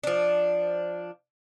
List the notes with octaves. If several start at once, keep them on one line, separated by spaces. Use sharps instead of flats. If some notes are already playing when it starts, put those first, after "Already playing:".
F3 D4